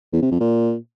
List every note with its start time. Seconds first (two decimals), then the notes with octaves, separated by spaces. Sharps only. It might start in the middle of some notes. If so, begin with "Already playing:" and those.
0.13 E2
0.22 C3
0.31 F2
0.41 A#2